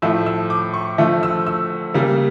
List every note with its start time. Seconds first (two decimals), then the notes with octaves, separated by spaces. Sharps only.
0.02 A2 F3 A3 E6
0.26 E6
0.50 D6
0.74 C#6
0.98 D3 F3 A3
1.23 E6
1.46 E6
1.94 C#3 G3 A#3